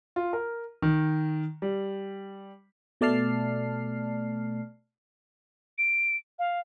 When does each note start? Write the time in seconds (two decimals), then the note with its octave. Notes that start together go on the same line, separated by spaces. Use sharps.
0.16 F4
0.33 A#4
0.82 D#3
1.62 G3
3.01 B2 A3 D5 A5 F6 C7
5.78 D7
6.39 F5